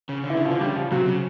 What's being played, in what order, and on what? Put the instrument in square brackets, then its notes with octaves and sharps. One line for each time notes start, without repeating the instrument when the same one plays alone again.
[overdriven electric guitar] C#3
D3
[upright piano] E3 E4
[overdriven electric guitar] C#3
[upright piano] F3 F4
[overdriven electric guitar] D3
[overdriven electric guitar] C#3 [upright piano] G3 G4
[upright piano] F3 F4
[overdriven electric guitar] C3 [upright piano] F#3 F#4
[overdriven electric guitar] C#3